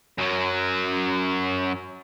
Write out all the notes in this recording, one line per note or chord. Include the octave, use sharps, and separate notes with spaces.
F#2 F#3